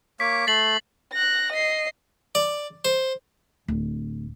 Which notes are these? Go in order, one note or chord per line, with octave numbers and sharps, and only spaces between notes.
A#3 C#5 D6 B6
A3 A6 C7 F#7
F#6 A#6
D#5 C7
D5
C5
D1